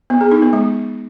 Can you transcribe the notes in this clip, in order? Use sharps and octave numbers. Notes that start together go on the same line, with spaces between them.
B3
G#4
D#4
B3
G#3